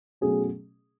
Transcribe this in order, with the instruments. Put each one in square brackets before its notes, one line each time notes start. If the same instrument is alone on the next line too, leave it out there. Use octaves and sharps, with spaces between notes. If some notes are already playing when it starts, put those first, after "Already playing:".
[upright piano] B2 F#3 A3 C#4 G#4